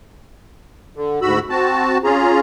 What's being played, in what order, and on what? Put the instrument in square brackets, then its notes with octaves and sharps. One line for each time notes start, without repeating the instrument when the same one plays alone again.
[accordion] D3
D2 G#2 F#4 B5 E6
C4 F#4 A5
C#4 F4 G#4 A#5